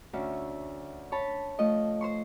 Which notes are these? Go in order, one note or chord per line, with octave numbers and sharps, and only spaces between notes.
D2 C#4 E5
C#5 A5 B5
F3 A3 D#5
C5 C6 C#6